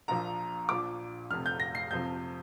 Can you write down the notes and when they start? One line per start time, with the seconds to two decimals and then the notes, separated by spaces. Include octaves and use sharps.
0.08 A#1 A#2 F3 A#5
0.69 A#1 A#2 F3 D6
1.31 F1 F2 C3 F6
1.46 G6
1.60 A#6
1.75 C7
1.91 F2 C3 F3 G6